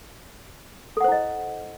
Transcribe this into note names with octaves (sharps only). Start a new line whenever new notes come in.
E4 A4 C5 D#5 F#5